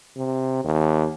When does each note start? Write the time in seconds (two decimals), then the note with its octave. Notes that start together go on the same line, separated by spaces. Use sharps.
0.17 C3
0.65 D#2